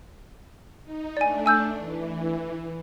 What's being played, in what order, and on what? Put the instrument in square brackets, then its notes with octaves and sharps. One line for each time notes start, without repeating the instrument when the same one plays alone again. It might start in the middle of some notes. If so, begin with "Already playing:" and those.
[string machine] D#4
[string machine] A3 D4 [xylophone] D5 G#5
[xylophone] G#5 E6 G6
[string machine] E3